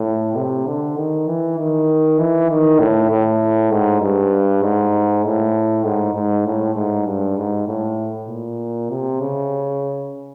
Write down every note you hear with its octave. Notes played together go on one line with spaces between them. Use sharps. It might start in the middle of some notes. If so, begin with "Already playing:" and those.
Already playing: A2
C3
D3
D#3
E3
D#3
E3
D#3
A2
A2
G#2
G2
G#2
A2
G#2
G#2
A2
G#2
G2
G#2
A2
A#2
C3
C#3